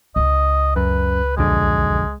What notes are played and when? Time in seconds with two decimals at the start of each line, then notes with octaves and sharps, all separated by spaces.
0.16 C#2 D#5
0.76 F#2 B4
1.37 B1 F2 D3 G#3